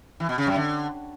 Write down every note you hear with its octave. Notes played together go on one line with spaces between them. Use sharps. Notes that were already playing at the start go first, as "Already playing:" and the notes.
E3
B2
C#3
F#2
D3